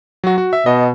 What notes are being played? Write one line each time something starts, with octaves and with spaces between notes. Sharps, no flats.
F#3 F#4
F#4
E5
B2 D#5